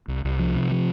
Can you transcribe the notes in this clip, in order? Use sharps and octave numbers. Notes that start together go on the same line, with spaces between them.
C2
C2
F3
C3
F3